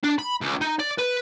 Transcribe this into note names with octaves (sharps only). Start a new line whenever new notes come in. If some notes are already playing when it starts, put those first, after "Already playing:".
D4
B5
C#2
D#4
D5
B4